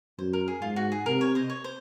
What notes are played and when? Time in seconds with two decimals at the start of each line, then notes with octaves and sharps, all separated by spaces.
0.18 F#2 C5
0.33 A#4
0.48 G#4
0.62 G#2 F4
0.76 F#4
0.92 G#4
1.06 C3 A#4
1.21 C#5
1.35 C5 D#5
1.50 C#5
1.64 C5